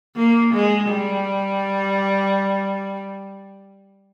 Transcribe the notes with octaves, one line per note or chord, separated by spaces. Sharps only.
A#3
G#3
G3